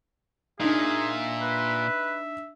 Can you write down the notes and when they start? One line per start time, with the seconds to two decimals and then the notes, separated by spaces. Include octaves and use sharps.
0.60 A#2 D4 D#4 G#4 E5
1.42 B4